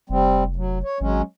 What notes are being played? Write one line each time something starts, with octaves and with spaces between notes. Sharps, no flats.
F1 G3 C4
F#3
C#5
G#1 F#3 G#3 C#4